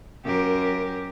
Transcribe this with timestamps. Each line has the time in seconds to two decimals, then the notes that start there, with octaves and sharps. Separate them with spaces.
0.24 F#2 G4 A#4